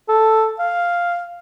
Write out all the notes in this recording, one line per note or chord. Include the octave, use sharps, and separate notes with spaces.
A4
F5